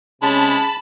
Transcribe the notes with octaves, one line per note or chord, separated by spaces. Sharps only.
C3 G#3 C#4 A5 B5